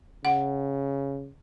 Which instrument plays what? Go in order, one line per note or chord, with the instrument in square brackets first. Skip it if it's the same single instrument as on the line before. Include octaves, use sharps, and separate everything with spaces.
[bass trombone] C#3 [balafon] F#5